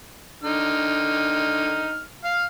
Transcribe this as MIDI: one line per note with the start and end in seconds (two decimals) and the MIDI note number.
0.43 2.02 50
0.43 2.02 63
0.43 2.02 89
2.24 2.44 77
2.24 2.44 89